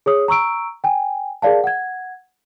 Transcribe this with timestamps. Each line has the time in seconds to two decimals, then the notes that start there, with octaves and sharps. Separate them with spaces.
0.06 G#4 C#5 D#6
0.28 A#5 C#6 E6 D7
0.84 G5 G#5
1.42 G#4 A#4 D5 F5 A5
1.64 F#5 G#6